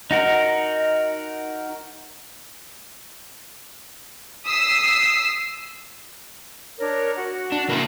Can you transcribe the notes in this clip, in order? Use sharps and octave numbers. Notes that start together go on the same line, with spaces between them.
D#4 F#4 A#4
D#6 E6 B6 C7
D4 A#4 C#5
F#4 F#5
D4
A#3 E4